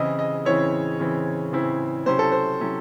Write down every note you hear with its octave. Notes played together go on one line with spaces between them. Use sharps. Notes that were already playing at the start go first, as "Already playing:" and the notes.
Already playing: C#3 E3 C4 E4 D#5
D#5
C#3 E3 C4 E4 C#5
C#3 E3 C4 E4
C#3 E3 C4 E4
C3 F#3 C#4 E4 C5
A4
C5
C3 F#3 C#4 E4